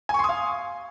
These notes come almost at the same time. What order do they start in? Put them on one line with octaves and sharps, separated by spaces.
G#5 C#6 C6 D#6 F5